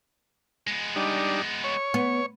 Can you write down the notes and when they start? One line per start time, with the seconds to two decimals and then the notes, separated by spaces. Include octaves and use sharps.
0.67 G#3 B3
0.96 G3 D4 D#4
1.64 C#5
1.94 B3